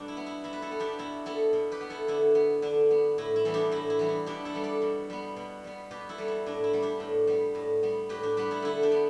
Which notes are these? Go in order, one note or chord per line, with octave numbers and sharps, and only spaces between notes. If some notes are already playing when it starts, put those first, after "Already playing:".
Already playing: B2 G3 D4 G4 A4
E4
B3
E4
B2 E4
B4
E4 A4
B3
D4 G4
B2 E4
B3 E4 A4
B2
G4 B4
B3
E4 A4
D3 E4
B3
D3 D4
B3
A2 E4
E4
E3 G3 B3 A4
D4 G4
A2 E4
E4
E3 G3 B3
E4
B2 D4 G4
E4 A4
G3 B3
A4 D5
B2
G3 B3
B2
G3 B3
B2 G4 B4
E4 A4
G3 B3
E4
A2 D4
E4
G3 B3
D4 G4
A2
G3 B3
A2
G3 B3
A2 G4 B4
D4 G4
G3 B3 G4 B4
E4 A4
D3 E4 A4
D4 G4
B3